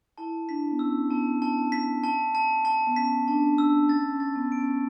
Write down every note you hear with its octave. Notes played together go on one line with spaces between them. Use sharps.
E4 A5
D4 B6
B3
C#4 E6
B3 A5
A5
B6
A5
A5
A5
B3
C#4 B6
D4 A5
D4 E6
C#4 A6
C#4
A6
B3
D7
C#4